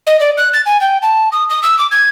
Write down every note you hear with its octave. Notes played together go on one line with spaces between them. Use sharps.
D#5
D5
F#6
A6
G#5
G5
A5
D#6
D#6
E6
D6
G#6